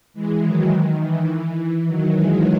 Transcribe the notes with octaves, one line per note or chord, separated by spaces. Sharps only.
E3 G#3
D#3 F#3
D#3
E3
D#3 F#3
E3 G#3